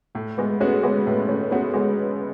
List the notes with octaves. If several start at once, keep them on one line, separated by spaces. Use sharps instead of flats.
A2 A3
G#3 B3
G#3 A3 B3 C#4 F#4
G#3 B3
A2 A3
A3 C#4
G#3 A3 B3 C#4 F#4
G#3 B3